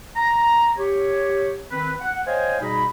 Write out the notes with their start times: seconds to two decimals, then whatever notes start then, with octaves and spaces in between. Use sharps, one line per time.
0.16 A#5
0.78 G4 C#5
1.72 D#3 C4 B4
2.01 F#5
2.27 C5 C#5 D#5 F5 G5 G#5
2.61 B2 G3 D#4 G#4 A#5 B5